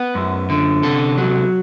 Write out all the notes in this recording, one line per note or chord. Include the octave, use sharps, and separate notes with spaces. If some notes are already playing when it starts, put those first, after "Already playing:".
Already playing: B3
F#2
D3
C3 A4
F#3